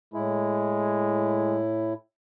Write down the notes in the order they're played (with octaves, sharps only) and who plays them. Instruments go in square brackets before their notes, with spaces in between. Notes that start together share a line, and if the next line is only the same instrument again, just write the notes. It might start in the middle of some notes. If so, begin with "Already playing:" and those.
[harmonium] A2 E4 [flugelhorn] G#3